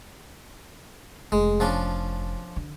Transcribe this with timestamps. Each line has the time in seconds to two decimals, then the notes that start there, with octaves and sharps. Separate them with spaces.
1.32 F1 G#3
1.60 F3 C#4 D4
2.56 D3